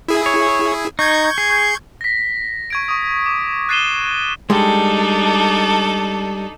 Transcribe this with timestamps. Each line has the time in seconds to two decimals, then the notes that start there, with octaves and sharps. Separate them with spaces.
0.08 E4 G#4
0.26 C#5
0.99 D#4 C#6 G6 G#6
1.38 G#4
2.01 A#6 B6
2.70 C#6 G#6 D7
2.88 C#6 D#6
3.26 D6
3.69 F#6 A6 C7 D#7 E7 G7
4.50 G3 G#3 D4 D#4 A4